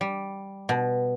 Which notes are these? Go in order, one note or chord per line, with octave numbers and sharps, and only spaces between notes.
G3
B2